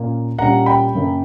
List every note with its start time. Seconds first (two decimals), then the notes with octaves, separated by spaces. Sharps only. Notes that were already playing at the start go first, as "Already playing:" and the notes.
Already playing: A#2 A#3 C#4
0.39 A#2 G3 C#4 F#5 A#5
0.66 G5 B5
0.95 F#2 C#3 F#3 A#3